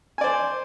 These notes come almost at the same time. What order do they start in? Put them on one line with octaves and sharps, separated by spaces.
G#5 D5 C5